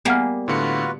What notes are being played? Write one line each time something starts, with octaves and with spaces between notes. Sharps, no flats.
G3 A#3 B3 G#4 F#5 F6
A2 D3 F4 F#4 B4 C#7